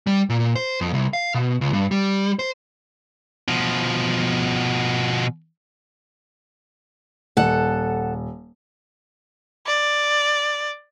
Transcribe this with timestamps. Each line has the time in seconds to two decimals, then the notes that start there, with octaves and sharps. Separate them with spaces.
0.07 G3
0.30 A#2
0.56 C5
0.81 F2
0.94 C2
1.13 F5
1.35 B2
1.61 C#2
1.73 G2
1.91 G3
2.39 C5
3.48 B2 F3
7.37 D#1 A4 F#5
9.67 D5